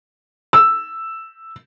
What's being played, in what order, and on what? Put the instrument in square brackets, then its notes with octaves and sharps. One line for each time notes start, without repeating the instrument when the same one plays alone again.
[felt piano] E6